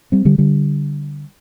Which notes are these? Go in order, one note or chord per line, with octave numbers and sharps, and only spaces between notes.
G3 C4
D3 G3
D3 G3